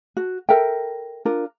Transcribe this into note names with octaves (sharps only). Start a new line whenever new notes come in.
F#4
A4 A#4 E5 G5
D4 F4 A#4